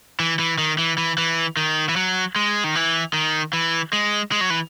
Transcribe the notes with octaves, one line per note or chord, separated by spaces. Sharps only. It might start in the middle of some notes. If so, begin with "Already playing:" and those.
E3
E3
D#3
E3
E3
E3
D#3
E3
F#3
G#3
D#3
E3
D#3
E3
G#3
G#3
F#3
E3